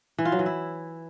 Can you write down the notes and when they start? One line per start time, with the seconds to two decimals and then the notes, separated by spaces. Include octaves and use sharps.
0.18 E3
0.25 F4
0.32 F#3
0.39 E3
0.46 E4